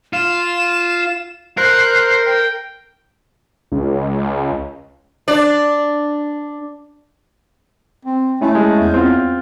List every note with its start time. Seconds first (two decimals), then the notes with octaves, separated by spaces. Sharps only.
0.13 F4 E7
1.57 A#4 C5 F#6
2.26 G5
3.72 C#2
5.28 D4 D5
8.05 C4
8.41 A3 C#4 E4
8.55 G#3
8.80 E2
8.94 C4 F4